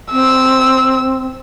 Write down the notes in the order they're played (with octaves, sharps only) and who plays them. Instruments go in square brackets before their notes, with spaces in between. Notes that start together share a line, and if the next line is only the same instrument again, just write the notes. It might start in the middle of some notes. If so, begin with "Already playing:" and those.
[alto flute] C4 [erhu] E6